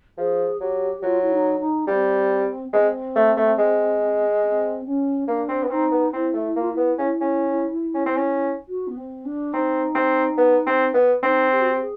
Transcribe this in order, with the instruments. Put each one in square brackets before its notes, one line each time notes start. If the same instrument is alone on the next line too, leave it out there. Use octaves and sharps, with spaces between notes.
[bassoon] F3 [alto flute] G#4
[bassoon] F#3 [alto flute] G4
[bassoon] F#3 [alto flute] F4
[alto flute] E4
D#4
D#4
[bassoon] G3 [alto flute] C4
[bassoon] G#3 [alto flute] C4
[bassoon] A3
A3
G#3
[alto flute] C4
C#4
[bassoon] A#3 [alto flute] D4
[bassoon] C4
B3
[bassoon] C4 [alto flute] D#4
[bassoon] B3
[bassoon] C4 [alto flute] E4
[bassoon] A3
[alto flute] E4
[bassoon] A#3 [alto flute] F4
[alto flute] E4
[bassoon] B3
[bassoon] C#4 [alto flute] E4
[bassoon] C#4
C#4
C4
C#4
[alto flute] F#4
B3
C4
D4
[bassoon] C4 [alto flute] D#4
[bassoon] C4
B3
C4
B3
[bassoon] C4 [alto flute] D#4
[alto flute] G4
F#4
G4
G#4